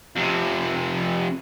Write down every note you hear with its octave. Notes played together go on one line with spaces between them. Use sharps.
F2 C3